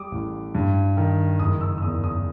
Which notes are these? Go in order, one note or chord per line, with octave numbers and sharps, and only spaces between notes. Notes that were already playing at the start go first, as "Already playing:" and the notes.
Already playing: G3 D6 D#6
A1
G2
D#3
F#1 D#6
E6
E6
E2 D#6
D#6